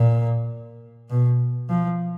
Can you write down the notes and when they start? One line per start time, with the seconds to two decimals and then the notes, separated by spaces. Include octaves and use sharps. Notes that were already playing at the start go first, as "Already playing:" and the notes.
Already playing: A#2
1.10 B2
1.69 F3